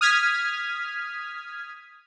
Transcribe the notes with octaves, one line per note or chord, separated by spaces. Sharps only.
D#6 F6 G#6 B6